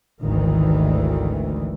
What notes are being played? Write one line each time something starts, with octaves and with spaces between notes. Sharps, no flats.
G#1 D2 D#3 E3